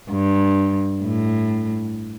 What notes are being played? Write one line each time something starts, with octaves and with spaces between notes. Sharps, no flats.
G2
A2